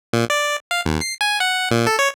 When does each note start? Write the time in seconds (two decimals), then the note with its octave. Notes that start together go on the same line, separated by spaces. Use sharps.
0.13 A#2
0.30 D5
0.71 F5
0.86 D#2
1.01 C7
1.21 G#5
1.40 F#5
1.71 A#2
1.87 A4
1.99 C#5